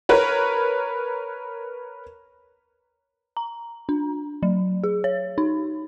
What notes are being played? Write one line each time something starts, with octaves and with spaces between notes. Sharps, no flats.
A#4 B4 C#5
A#5
D4
F#3
G#4
C#5
D#4